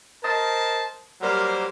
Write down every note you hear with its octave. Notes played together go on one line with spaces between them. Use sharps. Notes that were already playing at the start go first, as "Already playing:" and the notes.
A#4 C5 D#5 A5
F#3 G3 A#3 A#4 C5